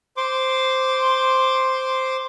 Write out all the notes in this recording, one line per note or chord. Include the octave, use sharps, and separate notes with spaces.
C5 C6 D6